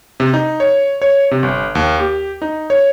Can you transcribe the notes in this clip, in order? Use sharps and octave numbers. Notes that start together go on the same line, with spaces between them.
C3
D#4
C#5
C#5
C3
G1
D#2
G4
D#4
C#5